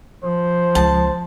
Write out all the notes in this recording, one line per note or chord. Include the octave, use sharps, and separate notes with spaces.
F3 C5
C#2 A5